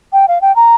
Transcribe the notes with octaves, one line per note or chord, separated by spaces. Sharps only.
G5
F5
G5
A#5